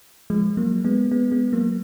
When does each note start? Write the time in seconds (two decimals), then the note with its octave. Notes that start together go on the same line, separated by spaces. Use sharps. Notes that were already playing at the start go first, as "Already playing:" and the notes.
0.30 F3 G#3
0.57 F#3 A#3
0.85 G#3 B3
1.11 G#3 B3
1.32 G#3 B3
1.53 F#3 A#3